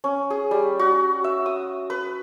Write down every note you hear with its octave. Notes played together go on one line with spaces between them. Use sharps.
C#4
G#4
G3
F#4
E5
D#6
B4